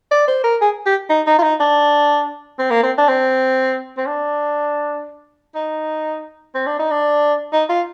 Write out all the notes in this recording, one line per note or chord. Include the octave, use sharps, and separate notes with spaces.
D5
C5
A#4
G#4
G4
D#4
D#4
F4
D#4
D4
C4
A#3
C4
D4
C4
C4
D4
D#4
C4
D4
D#4
D4
D#4
F4